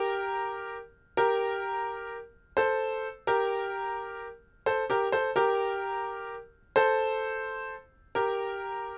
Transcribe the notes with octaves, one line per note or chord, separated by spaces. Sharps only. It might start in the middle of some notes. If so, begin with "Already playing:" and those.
Already playing: G4 A#4
G4 A#4
A4 C5
G4 A#4
A4 C5
G4 A#4
A4 C5
G4 A#4
A4 C5
G4 A#4